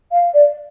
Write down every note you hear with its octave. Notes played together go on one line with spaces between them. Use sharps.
F5
D5